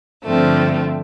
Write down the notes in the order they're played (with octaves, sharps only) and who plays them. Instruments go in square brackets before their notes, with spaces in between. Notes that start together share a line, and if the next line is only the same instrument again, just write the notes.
[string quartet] G2 D3 F3 A3 C4